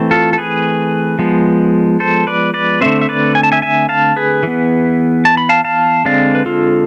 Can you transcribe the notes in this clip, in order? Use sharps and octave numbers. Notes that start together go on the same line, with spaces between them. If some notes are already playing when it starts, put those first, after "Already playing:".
Already playing: E3 A3 C4
F4 A4
A4
G#4 B4
F3 G#3 B3
A4 C5
B4 D5
B4 D5
D3 A3 C4 C5 E5
E5
B4 D5
G#5
A5
E5 G#5
E5 G#5
F5 A5
G#4 B4
E3 B3
A5
B5
F5 A5
F5 A5
D3 G#3 C4 D5 F5
B4
F4 A4